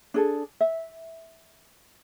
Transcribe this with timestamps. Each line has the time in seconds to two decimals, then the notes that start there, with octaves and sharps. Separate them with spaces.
0.14 D4 G#4 A4
0.60 E5